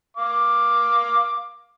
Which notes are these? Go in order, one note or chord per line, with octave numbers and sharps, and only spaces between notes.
F5 D6